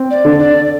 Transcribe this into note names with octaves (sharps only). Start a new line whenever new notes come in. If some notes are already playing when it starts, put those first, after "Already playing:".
Already playing: C4
D5
D3
D5